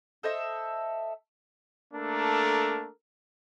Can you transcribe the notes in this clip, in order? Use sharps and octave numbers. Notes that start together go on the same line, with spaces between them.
A4 C5 D#5 E5
A3 A#3 D4 A4 A#4